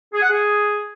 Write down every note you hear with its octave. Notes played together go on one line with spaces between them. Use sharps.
G#4
F#5
G#4